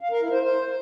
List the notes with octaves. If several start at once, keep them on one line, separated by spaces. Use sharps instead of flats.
F5
A#4
E4
C5
C5